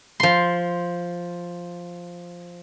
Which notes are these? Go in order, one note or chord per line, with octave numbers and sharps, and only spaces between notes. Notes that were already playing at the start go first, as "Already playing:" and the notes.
F3 C6